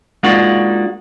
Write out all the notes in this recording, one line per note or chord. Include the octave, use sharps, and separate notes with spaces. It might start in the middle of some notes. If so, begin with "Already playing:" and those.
G#3 A#3 D4 D#4 F4 F#4